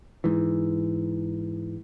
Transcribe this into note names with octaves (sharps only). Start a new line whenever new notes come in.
G#2 E3